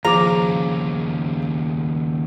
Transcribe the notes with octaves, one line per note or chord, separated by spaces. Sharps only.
D#2 C#3 F3 F4 G#4 A#5 D6